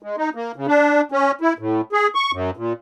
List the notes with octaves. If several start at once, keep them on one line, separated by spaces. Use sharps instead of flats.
G#3
D#4
A#3
C#3
D4
C#4
E4
A2
G#4
C#6
F#2
A#2